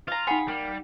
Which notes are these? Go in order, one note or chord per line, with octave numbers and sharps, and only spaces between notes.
F4 F5 A#5
D#4 G#4 F#5 G5 B5
G3 A#3